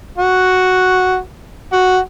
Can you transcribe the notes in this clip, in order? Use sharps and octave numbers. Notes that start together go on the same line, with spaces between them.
F#4
F#4